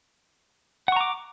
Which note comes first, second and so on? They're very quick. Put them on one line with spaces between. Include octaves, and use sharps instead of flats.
F#5 C#6 A#5 D6